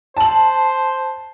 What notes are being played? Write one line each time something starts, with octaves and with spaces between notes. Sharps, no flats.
C5 A5 F#7